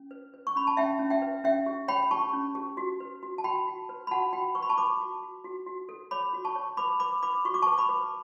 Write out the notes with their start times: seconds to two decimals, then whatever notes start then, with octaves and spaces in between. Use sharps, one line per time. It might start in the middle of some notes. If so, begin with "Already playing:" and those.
Already playing: C#4
0.11 B4
0.34 B4
0.47 C#6
0.56 C#4 B5
0.67 A5
0.77 C#4 E5 G5
0.99 C#4
1.10 E5 G5
1.22 B4
1.44 C#4 E5 G5
1.66 G4
1.88 C#5 G5 B5
2.11 G4 A5 C#6
2.33 C#4
2.55 G4
2.77 F#4
3.00 B4
3.23 F#4
3.38 A5
3.44 F#4 G5 B5
3.67 F#4
3.89 B4
4.07 B5
4.11 F#4 F#5 A5
4.33 F#4 G5 B5
4.55 B4 C#6
4.63 B5
4.69 A5 C#6
4.77 B4 B5 D6
5.00 F#4
5.22 F#4
5.44 F#4
5.66 F#4
5.89 A4
6.11 C#5 B5 D6
6.33 F#4
6.45 A5 C#6
6.56 C#5
6.77 B4 B5 D6
7.00 B4 B5 D6
7.22 B4 B5 D6
7.45 F#4 C#6
7.54 D6
7.62 B4 A5 C#6
7.78 B5 D6
7.89 B4